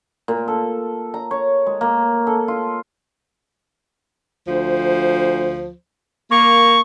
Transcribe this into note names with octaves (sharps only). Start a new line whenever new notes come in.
A#2
A4
A#5
C#5
G#3
A#3
A4
F4
D2 F3 C5
A#3 C#6